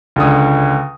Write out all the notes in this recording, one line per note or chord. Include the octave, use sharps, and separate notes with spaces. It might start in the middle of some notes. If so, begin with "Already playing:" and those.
C#2 D3 D#6